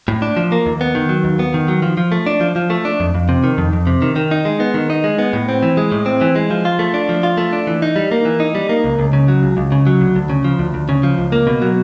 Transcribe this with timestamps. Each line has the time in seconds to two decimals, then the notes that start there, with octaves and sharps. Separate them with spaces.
0.08 A2
0.22 D4
0.37 F3
0.52 A#3
0.66 D#2
0.81 B3
0.95 D#3
1.09 F#3
1.24 D#2
1.39 B3
1.54 D#3
1.68 F#3
1.82 F3
1.97 F3
2.12 A3
2.26 D4
2.41 F3
2.56 F3
2.70 A3
2.85 D4
3.00 F2
3.15 F2
3.29 C3
3.44 D#3
3.58 F2
3.73 F2
3.87 C3
4.02 D#3
4.16 D#3
4.31 D#4
4.45 G#3
4.60 B3
4.74 D#3
4.90 D#4
5.04 G#3
5.19 B3
5.33 A2
5.49 C4
5.63 E3
5.77 G#3
5.92 A2
6.06 C4
6.21 E3
6.36 G#3
6.50 F3
6.65 F4
6.79 A3
6.94 D4
7.09 F3
7.23 F4
7.37 A3
7.53 D4
7.67 E3
7.82 D#4
7.96 G3
8.11 A#3
8.25 E3
8.40 D#4
8.55 G3
8.69 A#3
8.84 C#2
8.99 C#2
9.13 C#3
9.28 F#3
9.43 C#2
9.57 C#2
9.72 C#3
9.87 F#3
10.01 D2
10.15 D2
10.29 C#3
10.44 F3
10.59 D2
10.74 D2
10.89 C#3
11.03 F3
11.18 C#2
11.32 A#3
11.47 B2
11.62 F#3